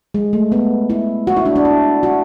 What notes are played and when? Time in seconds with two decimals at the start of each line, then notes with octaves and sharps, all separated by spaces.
0.14 G#3
0.33 A3
0.52 B3
0.90 E4
1.27 F#4
1.36 E4
1.46 D4
1.56 D4
1.65 E4
2.03 F#4